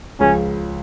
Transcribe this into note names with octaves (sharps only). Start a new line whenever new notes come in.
C#2 C#3 F3 C#4